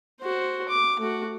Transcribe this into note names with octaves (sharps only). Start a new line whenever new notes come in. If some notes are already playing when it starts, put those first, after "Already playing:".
F#4 C5
D6
A3 F#4